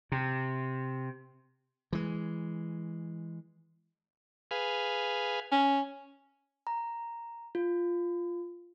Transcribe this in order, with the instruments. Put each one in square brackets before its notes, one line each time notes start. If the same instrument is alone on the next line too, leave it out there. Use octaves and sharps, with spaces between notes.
[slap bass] C3
E3 G#3
[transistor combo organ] G#4 B4 F5
[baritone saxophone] C#4
[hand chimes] A#5
F4